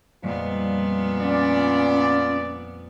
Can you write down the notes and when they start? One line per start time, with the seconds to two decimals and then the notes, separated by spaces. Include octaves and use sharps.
0.22 F2 A#2 G3 G#3 B3
1.21 C#4 F4 D5